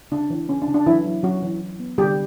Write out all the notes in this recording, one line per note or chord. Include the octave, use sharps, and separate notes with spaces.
C#3 D4
E3
C#3 C#4
D4
C#3
D4
E3 F#3 E4
F#3
F#3 C#4 F#4
E3
E3
B3
D3 G3 G4